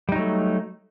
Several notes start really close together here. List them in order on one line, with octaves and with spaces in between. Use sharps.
G3 D#4 F#3 A3